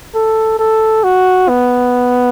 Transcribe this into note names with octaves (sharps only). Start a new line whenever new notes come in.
A4
A4
F#4
B3